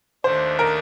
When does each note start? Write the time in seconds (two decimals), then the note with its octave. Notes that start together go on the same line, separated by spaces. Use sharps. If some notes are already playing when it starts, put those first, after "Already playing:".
0.24 D#2 D#3 A3 D4 C5
0.59 A#4